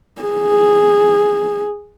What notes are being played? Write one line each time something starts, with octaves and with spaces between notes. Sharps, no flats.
G#4